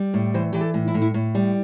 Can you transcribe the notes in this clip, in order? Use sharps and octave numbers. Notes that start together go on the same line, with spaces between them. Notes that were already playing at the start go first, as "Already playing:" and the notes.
Already playing: G3
A2
E3 C5
E3 G4
A4
A2
E4
A2
E4
A2
G3